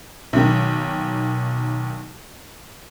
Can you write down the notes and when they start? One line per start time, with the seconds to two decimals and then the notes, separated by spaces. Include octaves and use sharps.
0.33 B1 D#3